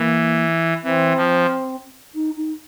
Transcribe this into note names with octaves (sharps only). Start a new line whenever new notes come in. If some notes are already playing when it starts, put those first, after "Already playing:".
Already playing: E3 A#3
E3 C4
F3
D#4
D#4